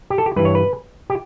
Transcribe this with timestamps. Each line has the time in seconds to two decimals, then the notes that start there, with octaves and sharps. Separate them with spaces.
0.10 G4
0.18 A4
0.26 G4
0.36 G2 E3 B4
0.45 C#5
0.55 B4
1.10 G4